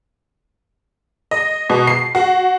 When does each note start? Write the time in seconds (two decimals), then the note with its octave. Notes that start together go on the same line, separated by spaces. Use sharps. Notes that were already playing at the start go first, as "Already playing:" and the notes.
1.31 D#5
1.70 B2
1.87 C7
2.15 F#4